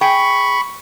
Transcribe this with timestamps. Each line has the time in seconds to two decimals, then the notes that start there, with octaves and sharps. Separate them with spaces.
0.01 G#4 G5 B5 C#6